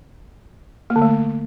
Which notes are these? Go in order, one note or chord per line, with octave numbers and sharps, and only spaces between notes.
A#3
D3
A3